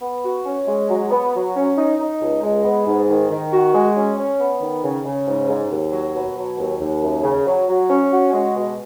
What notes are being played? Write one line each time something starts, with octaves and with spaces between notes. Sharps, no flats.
B3
F#4
C#4
G#3
F#3
B3
F#3
C#4
D#4
D#4
C#2
G#3
B3
G#2
D#3
D#3
F#4
G#3
C#4
C#4
B3
D#3
C#3
C#3
G#2
G#2
D#2
F#3
B2
F#3
D#2
D#2
F#2
C#3
F#3
F#3
C#4
F#4
G#3
B2